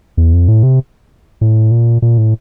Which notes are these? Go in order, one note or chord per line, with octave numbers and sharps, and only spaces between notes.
E2
F2
A2
C3
A2
A#2
A#2
A2